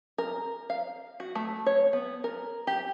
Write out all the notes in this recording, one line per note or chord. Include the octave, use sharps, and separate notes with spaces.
A#4
F5
F#4
A3
C#5
B3
A#4
G4